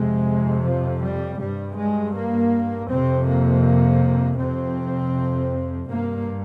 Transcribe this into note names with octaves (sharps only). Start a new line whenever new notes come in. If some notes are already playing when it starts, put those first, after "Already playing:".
Already playing: F2 C3 G#3
F3
G3
G2 G3
G#3
A#3
F2 C3 C4
A#3
F2 C3 C4
G2 A#3